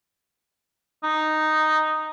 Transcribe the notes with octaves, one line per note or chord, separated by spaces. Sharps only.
D#4